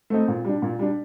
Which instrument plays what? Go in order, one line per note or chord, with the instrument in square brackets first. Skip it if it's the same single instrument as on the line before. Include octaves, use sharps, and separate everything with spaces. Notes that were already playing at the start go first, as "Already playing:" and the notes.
[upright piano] A3 C4 D#4
A#2
G3 D4
A#2
G3 D4